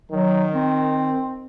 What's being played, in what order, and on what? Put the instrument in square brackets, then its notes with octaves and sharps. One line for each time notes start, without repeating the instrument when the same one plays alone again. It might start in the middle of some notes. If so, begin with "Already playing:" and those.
[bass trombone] D#3 [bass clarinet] F#3
[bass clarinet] C4